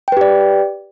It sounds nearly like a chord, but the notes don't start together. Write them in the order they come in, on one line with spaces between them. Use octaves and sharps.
G5 B4 G4 D5